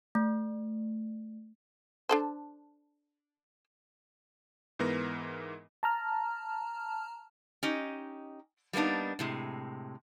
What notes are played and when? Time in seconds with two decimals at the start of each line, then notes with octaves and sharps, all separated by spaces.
0.15 A3
2.09 D4 A4 C5
4.79 G#2 E3 B3 A#4 A#6
5.83 A5 A#5 F6
7.63 C#4 D#4 G4 D#5
8.73 G3 A#3 B3 D4 D#4
9.19 A2 C3 G#3